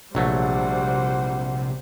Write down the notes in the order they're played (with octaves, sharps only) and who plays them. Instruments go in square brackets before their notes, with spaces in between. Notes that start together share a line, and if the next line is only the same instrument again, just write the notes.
[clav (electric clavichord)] A#1 F#3 A3 [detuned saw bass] C3 [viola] G3 C5 [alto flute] F#5